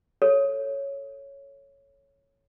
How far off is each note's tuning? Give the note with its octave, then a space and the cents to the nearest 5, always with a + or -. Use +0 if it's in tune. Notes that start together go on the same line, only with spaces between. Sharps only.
A4 +5 C#5 +0